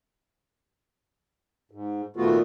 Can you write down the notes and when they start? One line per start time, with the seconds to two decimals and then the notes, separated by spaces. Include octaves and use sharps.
1.71 G#2
2.16 A#2 D#3 A3 B3 F4 F#4